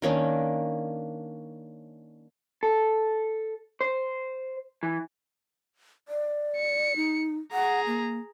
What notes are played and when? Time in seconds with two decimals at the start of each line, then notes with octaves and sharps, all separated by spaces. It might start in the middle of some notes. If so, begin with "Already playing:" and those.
0.02 D#3 A#3 C#4 D4
2.63 A4
3.81 C5
4.83 E3
6.08 D5
6.57 C#7
6.96 D#4
7.52 G#4 F#5 A#5
7.87 A#3